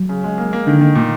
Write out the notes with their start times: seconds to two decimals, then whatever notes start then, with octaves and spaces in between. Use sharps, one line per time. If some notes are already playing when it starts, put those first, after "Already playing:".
Already playing: F#3
0.09 C#3
0.24 G#3
0.38 A#3
0.53 A#3
0.67 D3 D#3
0.81 D#3
0.95 A#2